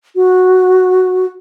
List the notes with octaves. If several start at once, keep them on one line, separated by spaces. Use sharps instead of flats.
F#4